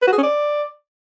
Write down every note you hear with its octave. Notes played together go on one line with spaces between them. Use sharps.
B4
F#4
G#4
C#4
D5